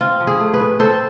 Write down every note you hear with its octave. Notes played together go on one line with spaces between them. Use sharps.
C4 F4
F3
E4 G#4
A3
G#4 B4
A2
C4 A4 C5